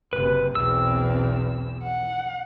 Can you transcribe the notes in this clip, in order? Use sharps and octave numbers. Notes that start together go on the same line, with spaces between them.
F#1 C3 B4
B1 E2 C4 E6
F#5